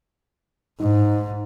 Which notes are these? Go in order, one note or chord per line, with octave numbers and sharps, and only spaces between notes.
G#2 D#4